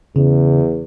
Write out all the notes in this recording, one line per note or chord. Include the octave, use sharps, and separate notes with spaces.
E2 C#3